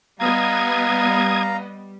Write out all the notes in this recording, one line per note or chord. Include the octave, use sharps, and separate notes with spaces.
G3 B3 D#5 F5 A#5 D#6 G#6